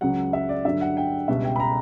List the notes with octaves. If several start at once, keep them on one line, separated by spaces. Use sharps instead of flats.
C#2 C#3 F#3 F#5
E5
D5
G2 D3 F#3 E5
F#5
G5
C#2 B2 G3 E5
G5
B5
A#5